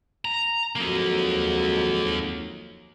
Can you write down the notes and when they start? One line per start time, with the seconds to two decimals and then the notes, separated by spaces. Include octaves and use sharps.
0.25 A#5
0.76 F2 G#2 F#3 A#3 D#4